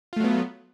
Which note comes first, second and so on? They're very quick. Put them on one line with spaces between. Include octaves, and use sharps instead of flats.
F4 A3 F#3 B3